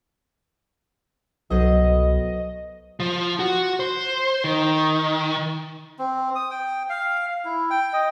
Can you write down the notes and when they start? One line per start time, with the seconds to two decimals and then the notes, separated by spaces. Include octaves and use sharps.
1.50 C2 B2 F#3 A4 C5 D#5
3.00 F3
3.39 F#4
3.80 C5
4.44 D#3
5.99 C4
6.35 D#6
6.50 G5
6.89 F5
7.45 E4
7.70 G5
7.93 D#5